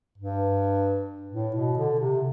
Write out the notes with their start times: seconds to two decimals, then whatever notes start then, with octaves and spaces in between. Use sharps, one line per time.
0.18 G2
1.32 A2
1.55 B2
1.77 D3
2.00 C3